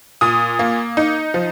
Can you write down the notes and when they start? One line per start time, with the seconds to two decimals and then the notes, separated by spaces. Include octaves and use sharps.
0.21 A#2 D#6
0.59 A#3
0.97 D#4
1.34 F3